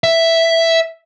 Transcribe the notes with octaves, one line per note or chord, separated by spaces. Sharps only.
E5